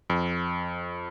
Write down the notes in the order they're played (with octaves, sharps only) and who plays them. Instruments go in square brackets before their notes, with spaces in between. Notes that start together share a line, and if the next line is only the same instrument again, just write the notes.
[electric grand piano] F2